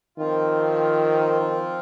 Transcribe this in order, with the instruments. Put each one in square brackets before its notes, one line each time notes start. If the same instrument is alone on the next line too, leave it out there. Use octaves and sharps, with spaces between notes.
[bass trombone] D#3 [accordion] F3 C4 F4